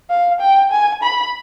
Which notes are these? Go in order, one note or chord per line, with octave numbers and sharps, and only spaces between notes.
F5
G5
G#5
B5